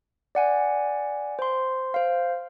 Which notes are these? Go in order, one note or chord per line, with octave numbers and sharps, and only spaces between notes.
D5 F#5 G#5
C5 C6
C5 F5